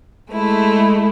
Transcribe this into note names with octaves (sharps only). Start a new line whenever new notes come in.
G#3 A3 E4